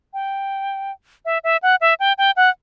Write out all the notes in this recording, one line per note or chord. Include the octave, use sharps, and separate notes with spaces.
G5
E5
E5
F#5
E5
G5
G5
F#5